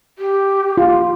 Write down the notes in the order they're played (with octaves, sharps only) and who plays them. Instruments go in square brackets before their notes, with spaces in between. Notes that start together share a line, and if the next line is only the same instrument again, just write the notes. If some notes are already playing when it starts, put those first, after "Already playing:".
[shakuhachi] G4
[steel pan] F4